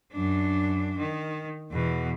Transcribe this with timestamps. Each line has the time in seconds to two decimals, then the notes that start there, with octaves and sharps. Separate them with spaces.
0.13 F#2 D4
0.99 D#3
1.72 E2 B2